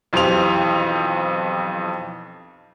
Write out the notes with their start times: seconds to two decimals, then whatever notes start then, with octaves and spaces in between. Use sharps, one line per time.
0.13 B1 F2 E3 G4 C5 F7